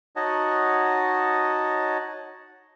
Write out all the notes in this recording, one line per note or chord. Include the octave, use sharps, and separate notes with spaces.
D#4 F#4 C#5 D#5 F#5 A5